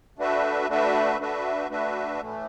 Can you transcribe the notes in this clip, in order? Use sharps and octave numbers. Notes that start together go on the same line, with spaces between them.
A3 D4 F#4 B4 E5
A3 D4 F#4 B4 E5
A3 D4 F#4 B4 E5
A3 D4 F#4 B4 E5
A2 E3 A3